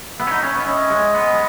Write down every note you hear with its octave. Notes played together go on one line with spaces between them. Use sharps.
B3 E5
C#4
D#4
C#4
B3
C#4 D#5
G#3
B3
G#3